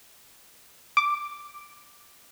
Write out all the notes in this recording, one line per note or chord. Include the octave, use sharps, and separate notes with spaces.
D6